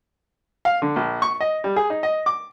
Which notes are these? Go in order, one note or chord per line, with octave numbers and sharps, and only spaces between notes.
F5
D3
A#1
C#6
D#5
G3
G#4
D#4
D#5
D6